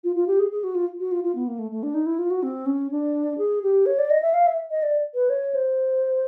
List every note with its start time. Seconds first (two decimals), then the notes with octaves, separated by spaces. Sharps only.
0.04 F4
0.16 F4
0.27 G4
0.39 G#4
0.51 G#4
0.64 F#4
0.75 F4
1.00 F#4
1.11 F4
1.24 F4
1.35 B3
1.48 A#3
1.59 A3
1.72 A3
1.83 D4
1.94 D#4
2.06 E4
2.19 F4
2.30 F#4
2.43 C4
2.66 C#4
2.91 D4
3.38 G#4
3.62 G4
3.86 C#5
3.99 D5
4.10 D#5
4.22 E5
4.34 F5
4.47 E5
4.71 D#5
4.83 D5
5.15 B4
5.30 C#5
5.54 C5